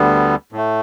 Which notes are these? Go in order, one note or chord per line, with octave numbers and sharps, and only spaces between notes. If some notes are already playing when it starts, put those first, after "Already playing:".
Already playing: D2 D3 G3 B3
A2 A3